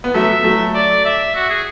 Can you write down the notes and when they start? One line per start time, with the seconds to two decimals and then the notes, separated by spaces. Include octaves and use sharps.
0.04 B3
0.14 F#3 A3 E5
0.44 F#3 A3
0.75 D5
1.05 E5
1.35 F#4
1.50 G#4